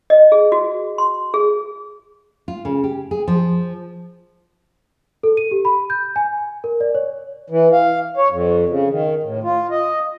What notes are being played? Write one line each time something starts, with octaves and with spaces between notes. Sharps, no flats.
D#5
G#4
F#4
C6
G#4
F4
C#3
G4
G#4
F3
A4
D#7
G4
B5
G6
G#5
A#4
D5
C#5
E3
F5
C#5
F2
C#3
D#3
A2
F4
D#5